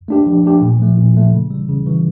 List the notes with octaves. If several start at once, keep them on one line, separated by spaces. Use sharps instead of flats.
A3 D4 G4
F3
A3 D4 G4
A#2
F3 A3
A#2
F3 A3
C#3
E3 G3
C#3
E3 G3